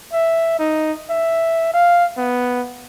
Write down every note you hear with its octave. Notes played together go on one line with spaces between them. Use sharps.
E5
D#4
E5
F5
B3